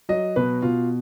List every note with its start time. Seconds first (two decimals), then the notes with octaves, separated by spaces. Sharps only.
0.09 F#3 D#5
0.36 B2 B4
0.62 B2 F4